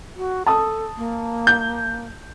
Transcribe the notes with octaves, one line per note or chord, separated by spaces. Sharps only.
F#4
A4 A5 D#6
A#3
G6